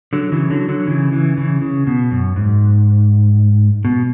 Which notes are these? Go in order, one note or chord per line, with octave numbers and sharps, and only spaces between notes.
D3 F#3
C#3 E3
D3 F#3
D3 F#3
C#3 E3
C#3 E3
C#3 E3
C#3
B2
F#2
G#2
B2